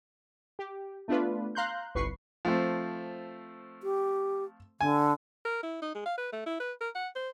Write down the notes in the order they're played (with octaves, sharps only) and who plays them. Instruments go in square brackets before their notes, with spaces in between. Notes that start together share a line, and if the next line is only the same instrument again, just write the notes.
[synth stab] G4
A3 B3 D4 F4 B4
F5 A#5 C6 F#6 G6
G1 C2 B4 C#6 C7
[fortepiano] F3 A3 C4
[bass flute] G4
[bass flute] D3 [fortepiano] G#5
[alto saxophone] A#4
E4
D#4
G#3
F5
B4
A3
E4
B4
A#4
F#5
C5